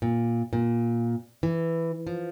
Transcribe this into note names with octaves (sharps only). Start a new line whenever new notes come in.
A#2
A#2
E3
F3